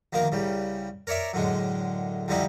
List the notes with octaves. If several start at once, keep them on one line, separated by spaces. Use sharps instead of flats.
D2 D#3 F3 A#3 A#4
C2 C#3 G3
A#4 C#5 D5 E5 A#5
F#2 A2 D3 G#3
C2 F2 D3 G3 D#4 E4